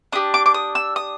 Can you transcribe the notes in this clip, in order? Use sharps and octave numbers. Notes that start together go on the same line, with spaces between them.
D4 G4 D#6
D6
D6
D#6
E6
D#6